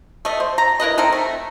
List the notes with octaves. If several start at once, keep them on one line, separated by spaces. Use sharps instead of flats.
A3 D#5
C5
A#5
E4 A#4 B4 D#5
C4 D#4 A4 A#4
A3